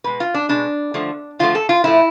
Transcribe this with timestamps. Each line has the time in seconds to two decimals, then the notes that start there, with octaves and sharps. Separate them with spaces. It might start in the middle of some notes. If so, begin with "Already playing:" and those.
0.04 B2 G#3 B4
0.20 F4
0.34 D4
0.49 B2 G#3 D4
0.94 D3 F3 A3
1.39 D3 F3 A3 F4
1.55 A4
1.69 F4
1.84 A2 F3 A3 E4